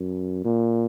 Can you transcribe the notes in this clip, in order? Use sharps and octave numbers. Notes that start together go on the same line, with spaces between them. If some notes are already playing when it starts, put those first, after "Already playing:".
Already playing: F#2
A#2